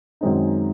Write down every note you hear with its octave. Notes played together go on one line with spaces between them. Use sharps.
F#2 D#3 G#3 C4 D#4